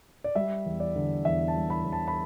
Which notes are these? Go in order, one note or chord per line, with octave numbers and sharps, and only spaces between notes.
D5
G3 E5
E2
D5
D3
E2 E5
A5
G3
B5
E2
A5
B5